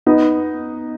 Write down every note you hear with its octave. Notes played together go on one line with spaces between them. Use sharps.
B3 D#4